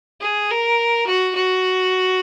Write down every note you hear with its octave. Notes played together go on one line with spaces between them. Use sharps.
G#4
A#4
F#4
F#4